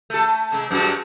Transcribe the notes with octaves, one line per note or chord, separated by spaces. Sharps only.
A3 A4
C3 G#3
F#2 G#3 F#4